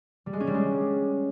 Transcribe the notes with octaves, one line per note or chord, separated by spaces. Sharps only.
G3
G#3
C#4
G3
G#3